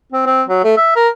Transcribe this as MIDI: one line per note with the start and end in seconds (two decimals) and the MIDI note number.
0.13 0.25 60
0.26 0.43 60
0.48 0.61 54
0.64 0.76 57
0.77 0.92 76
0.96 1.08 70